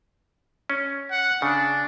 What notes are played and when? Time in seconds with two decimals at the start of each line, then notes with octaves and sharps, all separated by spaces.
0.70 C#4
1.11 F#5
1.42 C#3 D4